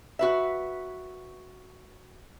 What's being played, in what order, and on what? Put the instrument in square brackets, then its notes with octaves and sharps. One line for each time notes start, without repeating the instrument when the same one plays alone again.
[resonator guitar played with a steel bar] F#4 B4 E5